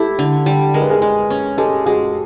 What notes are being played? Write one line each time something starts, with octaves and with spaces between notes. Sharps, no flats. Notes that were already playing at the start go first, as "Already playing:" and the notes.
Already playing: E4 G4 A4
D3
G3
G#3 A#4
B4
G#4 A#4
G#3
C#4
G#3 G4 A4
G#3 F#4 G#4